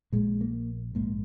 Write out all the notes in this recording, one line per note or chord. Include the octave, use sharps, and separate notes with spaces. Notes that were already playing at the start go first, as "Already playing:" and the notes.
A#1 A#2 G#3
A#3
A#1 G#2 A#3